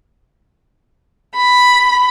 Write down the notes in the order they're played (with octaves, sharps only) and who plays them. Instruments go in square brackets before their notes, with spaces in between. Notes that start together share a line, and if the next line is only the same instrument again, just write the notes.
[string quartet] B5